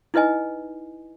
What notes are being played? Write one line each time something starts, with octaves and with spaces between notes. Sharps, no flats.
D#4 E4 B4 D#5 G#5